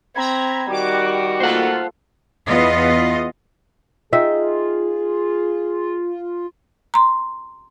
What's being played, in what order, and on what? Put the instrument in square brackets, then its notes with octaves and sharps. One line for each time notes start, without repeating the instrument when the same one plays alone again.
[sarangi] C4 [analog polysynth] A#5 B5 G#6
[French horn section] D#3 F#4 [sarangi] G3 [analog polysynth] D6
[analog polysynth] A#3 F4 A4 [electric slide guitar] C5 F#5
[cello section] E2 B3 F4 D#5
[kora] D#4 E5 G5 [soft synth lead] F4 [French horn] G#4
[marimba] A#5 C6